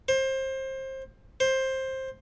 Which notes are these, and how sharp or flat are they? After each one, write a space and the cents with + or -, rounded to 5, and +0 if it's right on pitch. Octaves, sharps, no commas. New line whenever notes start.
C5 +25
C5 +15